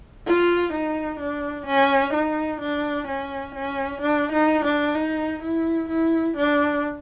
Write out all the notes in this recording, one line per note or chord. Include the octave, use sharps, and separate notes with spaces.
F4
D#4
D4
C#4
D#4
D4
C#4
C#4
D4
D#4
D4
D#4
E4
E4
D4